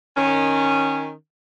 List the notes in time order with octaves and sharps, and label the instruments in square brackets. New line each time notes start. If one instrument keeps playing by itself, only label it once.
[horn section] D#3 C#4